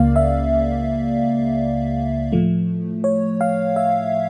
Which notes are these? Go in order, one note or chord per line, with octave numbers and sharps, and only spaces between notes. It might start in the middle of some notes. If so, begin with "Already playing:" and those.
Already playing: C#2 C#3 A#3 D5 F5
E5
A2 F3 A3
C#5
F5
E5